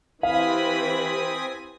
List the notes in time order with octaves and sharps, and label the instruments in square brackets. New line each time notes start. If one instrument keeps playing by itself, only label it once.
[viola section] E3 G4 B5 [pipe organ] C4 G#5 D#6 [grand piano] F5